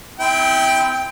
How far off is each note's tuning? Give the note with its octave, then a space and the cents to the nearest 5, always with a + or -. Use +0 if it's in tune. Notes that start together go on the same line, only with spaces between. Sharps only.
C4 -35 E4 -25 G5 +5